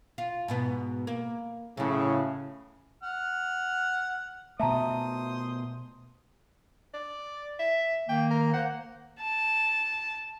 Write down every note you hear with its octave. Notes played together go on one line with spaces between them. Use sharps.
F4
G#2 B2 B3
A#3
A2 C#3 F#3 E4
F#5 F6
B2 A3 C5 E5 A5 A#5 D#6
D5
E5
D#3 A#3 G5
A#4
A#3 C5 F#5
A5